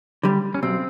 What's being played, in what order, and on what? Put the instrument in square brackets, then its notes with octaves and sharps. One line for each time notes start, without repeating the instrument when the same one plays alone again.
[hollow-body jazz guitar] D3 G3
[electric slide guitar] C#4
[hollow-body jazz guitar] B1 [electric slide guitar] C4